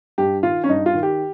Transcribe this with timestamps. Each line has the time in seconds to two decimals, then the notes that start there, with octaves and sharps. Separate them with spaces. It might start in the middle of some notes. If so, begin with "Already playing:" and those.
0.18 G2 G4
0.43 D#3 F4
0.64 C#4
0.69 G2 D#4
0.86 F4
0.94 D#3
1.03 G4